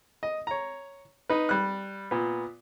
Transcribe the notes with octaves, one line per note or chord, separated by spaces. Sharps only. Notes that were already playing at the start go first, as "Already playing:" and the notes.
D#5
C#5 A#5
D#4 B4
G3 F#6
A#2 B3